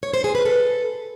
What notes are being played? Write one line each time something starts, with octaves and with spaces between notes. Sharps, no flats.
C#5
C5
G#4
B4
A4